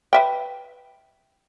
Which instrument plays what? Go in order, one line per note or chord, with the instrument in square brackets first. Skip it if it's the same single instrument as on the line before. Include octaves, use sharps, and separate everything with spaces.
[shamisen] B4 E5 G5